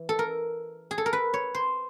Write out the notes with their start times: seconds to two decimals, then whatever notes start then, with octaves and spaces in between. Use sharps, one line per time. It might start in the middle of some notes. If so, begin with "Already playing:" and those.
Already playing: E3
0.09 A4
0.19 A#4
0.91 G#4
0.98 A4
1.06 A#4
1.13 B4
1.34 C#5
1.55 C5